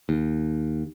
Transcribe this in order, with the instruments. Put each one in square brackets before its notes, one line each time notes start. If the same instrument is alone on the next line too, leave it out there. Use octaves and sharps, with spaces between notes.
[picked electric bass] D#2